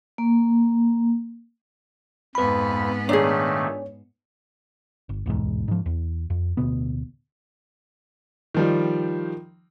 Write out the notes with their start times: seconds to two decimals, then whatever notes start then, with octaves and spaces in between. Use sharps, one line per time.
0.18 A#3
2.35 F2 G#2 B3 B4 B5
3.09 A#2 D#3 A3 D4 G#4 C#5
5.09 G1
5.26 D1 B1 E2 G#2
5.68 G#2 F3
5.86 E2
6.30 F2
6.57 D1 D2 B2 B3
8.54 D#3 F3 G3